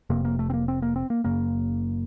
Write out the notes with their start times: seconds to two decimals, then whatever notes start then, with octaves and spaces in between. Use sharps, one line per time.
0.10 F1 F2 C3 A#3
0.25 A#3
0.39 A3
0.50 C4
0.54 A#3
0.68 C4
0.82 A#3
0.96 C4
1.10 A#3
1.24 F#1 F#2 C#3 A#3